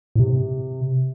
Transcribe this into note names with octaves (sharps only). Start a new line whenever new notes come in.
A2
C3